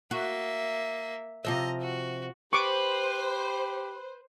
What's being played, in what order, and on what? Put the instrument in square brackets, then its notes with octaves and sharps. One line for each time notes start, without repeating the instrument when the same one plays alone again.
[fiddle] A#3 E5 [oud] F#4
[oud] C3 F3 E5 [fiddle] D#5 A#5
[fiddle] F#4
[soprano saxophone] G4 [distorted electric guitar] B4 [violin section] C5 [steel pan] C#6 D6